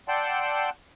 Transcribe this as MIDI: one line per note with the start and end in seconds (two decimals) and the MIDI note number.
0.08 0.70 74
0.08 0.70 78
0.08 0.70 79
0.08 0.70 81
0.08 0.70 84
0.08 0.70 88